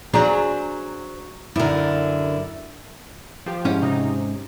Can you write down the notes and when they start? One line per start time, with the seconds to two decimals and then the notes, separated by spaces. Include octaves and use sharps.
0.14 F#3 D4 G#4 C5 A#5
1.56 F#2 D3 E4 A#4
3.46 F3 G4
3.65 G#2 C#4 E4
3.82 C3 D#4